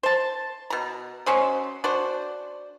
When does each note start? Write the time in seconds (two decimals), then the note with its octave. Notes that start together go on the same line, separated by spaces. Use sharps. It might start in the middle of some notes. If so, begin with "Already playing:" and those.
0.03 C5 A5
0.70 B2 A#5
1.26 F#3 C#4 C5 D#5
1.84 D4 F#4 C5